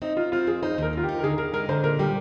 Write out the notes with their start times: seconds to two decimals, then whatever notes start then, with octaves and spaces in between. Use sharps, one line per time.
0.02 C4 D#4
0.17 C4 F4
0.32 C4 F4
0.47 F2 G#4
0.63 D#4 C5
0.78 D#2 A#4
0.93 D#3 F4
1.03 G4
1.09 D#4
1.19 A#4
1.24 D3 G#4
1.38 D3 A#4
1.54 G#3 A#4
1.69 D3 C5
1.84 A#2 A#4
1.99 G3 G4